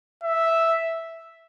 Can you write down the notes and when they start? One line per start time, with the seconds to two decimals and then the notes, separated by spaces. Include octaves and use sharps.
0.23 E5